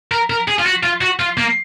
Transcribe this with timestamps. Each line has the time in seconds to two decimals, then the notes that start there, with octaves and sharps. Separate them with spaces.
0.12 A#4
0.30 A#4
0.48 G#4
0.59 F4
0.66 F#4
0.83 F4
1.01 F#4
1.20 F4
1.38 A#3